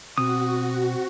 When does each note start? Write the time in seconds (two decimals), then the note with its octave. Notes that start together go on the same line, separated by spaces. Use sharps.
0.18 B2 C4 F#4 D#6